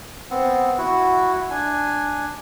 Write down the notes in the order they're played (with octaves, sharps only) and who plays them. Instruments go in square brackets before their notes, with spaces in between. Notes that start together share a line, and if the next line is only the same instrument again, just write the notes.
[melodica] B3 C4
E4 F#4
D4 G#5